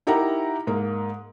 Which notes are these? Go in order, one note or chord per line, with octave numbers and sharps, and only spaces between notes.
D#4 E4 G4 A#4 F#5 A#5
G#2 A#3